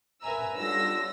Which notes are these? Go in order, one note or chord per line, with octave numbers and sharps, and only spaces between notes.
A#4 B4 E5 G#5 A#5 E6
B1 D3 G3 F4 E6 A#6